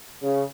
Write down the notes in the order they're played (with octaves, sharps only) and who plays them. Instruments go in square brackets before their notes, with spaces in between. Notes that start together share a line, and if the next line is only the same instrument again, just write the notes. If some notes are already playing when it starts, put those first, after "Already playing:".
[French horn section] C#3